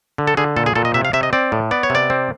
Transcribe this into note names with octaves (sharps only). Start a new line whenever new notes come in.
D3
A4
D3 G#4
A#2 A4
G#4
A#2 A4
D#5
C3 E5
F5
C3 E5
D#5
C4 D5
A2
B3 D5
C#5
C3 D5
C4